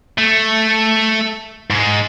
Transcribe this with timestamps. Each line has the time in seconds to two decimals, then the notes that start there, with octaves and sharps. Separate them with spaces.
0.18 A3
1.70 G#2 G#3